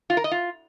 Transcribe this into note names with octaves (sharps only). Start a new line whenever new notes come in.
F4
A#4
D#5
F4